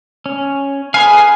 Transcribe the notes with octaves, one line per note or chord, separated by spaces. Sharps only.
C#4
G#4 B4 F5 G#5